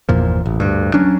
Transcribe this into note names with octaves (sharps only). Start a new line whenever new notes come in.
G1 E2 A#2 F3
A1
D2 G2
F#3 C#4 D4